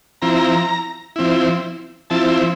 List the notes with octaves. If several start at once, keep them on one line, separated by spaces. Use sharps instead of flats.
F3 C4 E4 A#5
F3 C4 E4
F3 C4 E4 A5